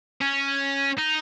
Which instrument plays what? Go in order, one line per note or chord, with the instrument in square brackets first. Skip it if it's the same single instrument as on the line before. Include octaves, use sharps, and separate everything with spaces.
[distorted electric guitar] C#4
D#4